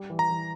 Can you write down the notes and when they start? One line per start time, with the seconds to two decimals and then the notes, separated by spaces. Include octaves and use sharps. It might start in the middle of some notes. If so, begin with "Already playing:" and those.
Already playing: G3
0.10 E3
0.19 A#5
0.30 E3